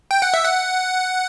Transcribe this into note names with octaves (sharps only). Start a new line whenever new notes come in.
G5
F#5
E5
F#5